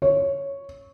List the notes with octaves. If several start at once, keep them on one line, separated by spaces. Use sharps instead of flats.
C#5